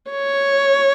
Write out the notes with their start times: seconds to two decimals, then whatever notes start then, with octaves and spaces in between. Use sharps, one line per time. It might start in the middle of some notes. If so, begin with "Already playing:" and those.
0.10 C#5